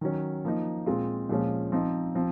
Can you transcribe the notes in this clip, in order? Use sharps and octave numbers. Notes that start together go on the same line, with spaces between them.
D#3 F#3 C#4
F3 A#3 D#4
A#2 G#3 C4 F4
A#2 F3 G#3 C#4
F3 C4 D#4
F3 C4